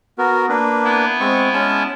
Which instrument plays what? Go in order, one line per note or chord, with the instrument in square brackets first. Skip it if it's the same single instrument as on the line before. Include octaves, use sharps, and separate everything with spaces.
[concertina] B3 F#4 A#4
A#3 D4 B4
[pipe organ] B3 E4
[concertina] G#3 C4 C#6
G#3 C#4 A5